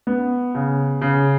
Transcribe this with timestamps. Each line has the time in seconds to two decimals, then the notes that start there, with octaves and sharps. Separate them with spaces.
0.07 B3
0.55 C#3
1.02 C#3